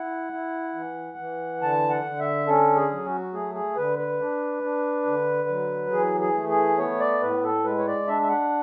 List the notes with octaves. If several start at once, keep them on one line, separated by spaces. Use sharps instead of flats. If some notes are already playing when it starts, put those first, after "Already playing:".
Already playing: E4 F#5
E4
E3
E3
D3 A5
F#5
D3
E5
C#4 A4
G#4
F#3
F#4
A3 G#4
G#4
D3 B4
B4
D4
D4
D3
F#3
E3 G#4
G#4
A3
G#4
B3 C#5
D5
A2 B4
A4
G#3 B4
C#5
D5
D4 E5
E5
F#5